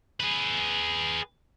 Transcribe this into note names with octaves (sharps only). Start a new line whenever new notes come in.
G#4 B4